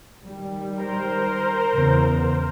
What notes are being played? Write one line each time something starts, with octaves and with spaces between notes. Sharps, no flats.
D#3 G3
A#4 C5
E2 C#3 B3